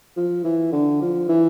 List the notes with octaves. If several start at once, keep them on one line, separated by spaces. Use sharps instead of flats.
F3
E3
D3
F3
E3